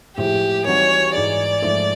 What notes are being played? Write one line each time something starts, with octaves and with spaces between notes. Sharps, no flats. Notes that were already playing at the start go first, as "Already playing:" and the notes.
A2 F3 G#3 G4
E3 G3 C4 D#4 F#4 C#5
G#2 E3 G#3 D5
G#2 F3 A3